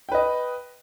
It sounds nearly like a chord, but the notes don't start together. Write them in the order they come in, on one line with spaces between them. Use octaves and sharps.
G5 B4 D#5